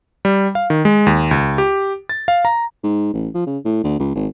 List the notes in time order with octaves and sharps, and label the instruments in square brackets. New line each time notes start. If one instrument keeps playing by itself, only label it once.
[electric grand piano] G3
F5
D#3
G#3
D#2
C#2
G4
A6
F5
A#5
[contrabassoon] G#2
A1
F3
C#3
A2
D2
C#2
G#1